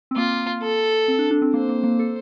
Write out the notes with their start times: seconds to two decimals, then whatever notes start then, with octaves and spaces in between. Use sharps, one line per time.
0.11 C4
0.16 A#3 F4
0.62 A4
1.08 C4
1.19 D4
1.31 D4
1.42 C4
1.54 A#3 C5
1.69 A#3
1.83 A#3
1.99 A4